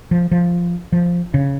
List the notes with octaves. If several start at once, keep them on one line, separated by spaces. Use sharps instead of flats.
F3
F3
F3
C#3